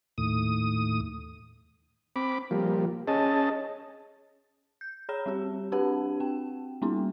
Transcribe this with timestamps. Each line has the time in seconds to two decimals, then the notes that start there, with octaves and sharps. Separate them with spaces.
0.18 D#2 A2 D#6
2.16 C4 B5 D6
2.51 F3 G3 A#3
3.08 C#4 G#4 D#5 A5
4.81 G6
5.09 G#4 C#5 A#5 B5 E7
5.26 G3 C4 G4
5.72 C4 D4 G4 B4 F#5 A5
6.20 C4 G5
6.82 G3 A#3 B3 C#4 D#4